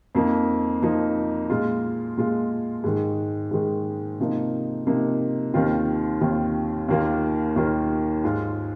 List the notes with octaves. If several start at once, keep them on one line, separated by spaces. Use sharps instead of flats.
F2 F3 A#3 D#4
F2 F3 A#3 D#4
A#2 G#3 F4
A#2 G#3 F4
G#2 D#3 G#3
G#2 D#3 G#3
C3 F3 A#3 D#4
C3 F3 A#3 D#4
D#2 D#3 C4 F4
D#2 D#3 C4 F4
D#2 D#3 A#3 F4
D#2 D#3 A#3 F4
G#2 G#3 F4